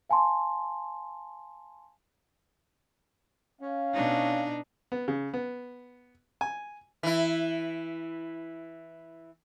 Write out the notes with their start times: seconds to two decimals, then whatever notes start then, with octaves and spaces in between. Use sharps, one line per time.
0.10 F5 G#5 A5 C6
3.61 C#4 F5
3.93 B2 D4 D#4
4.92 B3
5.08 C#3
5.34 B3
6.41 G#5
7.03 E3 E4